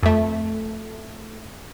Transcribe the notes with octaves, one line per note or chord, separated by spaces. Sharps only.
F2 A3